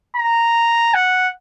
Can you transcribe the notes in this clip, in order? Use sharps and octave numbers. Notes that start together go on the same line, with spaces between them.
A#5
F#5